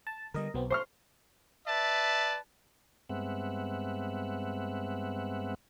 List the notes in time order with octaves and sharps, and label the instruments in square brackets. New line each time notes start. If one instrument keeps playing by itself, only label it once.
[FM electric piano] A5
[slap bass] D3 G3 [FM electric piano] A#4 D#5
[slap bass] B1 [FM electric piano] B2 B3 C4
[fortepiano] C5 C#6 F6 [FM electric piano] C6
[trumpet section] B4 D5 E5 A5
[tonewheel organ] G2 G#3 B3 C4 E5 F#5